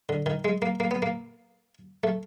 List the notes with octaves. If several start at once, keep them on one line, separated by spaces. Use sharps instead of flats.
D3
D#3
G#3
A#3
A#3
B3
A#3
A3